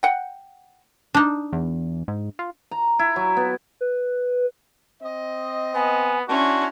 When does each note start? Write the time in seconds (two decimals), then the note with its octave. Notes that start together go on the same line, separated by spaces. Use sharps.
0.03 F#5 G5
1.14 D4 D#4
1.53 E2
2.08 G#2
2.39 F4
2.71 A#5
2.99 E4
3.16 F#3
3.37 B3
3.81 B4
5.03 C4 D#5
5.75 B3 G#5
6.29 C#4 D4 E4 F#4 A5 C6